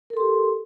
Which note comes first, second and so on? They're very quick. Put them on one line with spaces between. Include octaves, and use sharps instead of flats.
A#4 A4 C6 G4